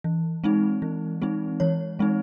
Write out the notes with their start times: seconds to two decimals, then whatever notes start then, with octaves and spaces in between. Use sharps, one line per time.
0.04 E3
0.44 G#3 C4 D#4
0.82 E3
1.22 G#3 C4 D#4
1.60 E3 C#5
1.99 G#3 C4 D#4